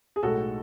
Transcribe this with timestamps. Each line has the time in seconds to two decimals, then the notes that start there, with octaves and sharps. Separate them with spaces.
0.16 G#4
0.23 B1 A2 G#3 F#4 A4